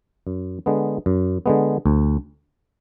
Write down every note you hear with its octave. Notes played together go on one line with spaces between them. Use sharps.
F#2
D3 G#3 B3
F#2
D3 G#3 B3
D2